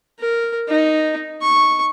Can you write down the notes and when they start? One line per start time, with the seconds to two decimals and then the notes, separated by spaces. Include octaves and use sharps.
0.19 A#4
0.69 D#4
1.42 C#6